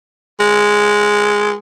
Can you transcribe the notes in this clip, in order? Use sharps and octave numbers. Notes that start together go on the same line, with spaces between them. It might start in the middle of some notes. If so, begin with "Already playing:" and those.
G#3